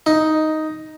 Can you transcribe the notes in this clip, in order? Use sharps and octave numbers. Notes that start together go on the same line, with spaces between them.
D#4